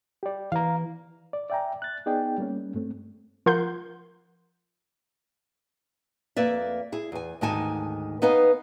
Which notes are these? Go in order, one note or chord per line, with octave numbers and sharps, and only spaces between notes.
G4 D5
E3 F5 A#5
D5
D5 E5 G5 G#5 A#5
F#6 A6
B3 D#4 G#4 D5 G5
G3 A#3 C#4
G2 A3 C4
F3 F4 A#4 F#5 C6 G6
F2 A#3 B4 D5 E5
E4 G#4
E2 G#5
D2 G#2 D#3 D#4 G#5 A5
B3 D#4 B4 D#5 F5 G#5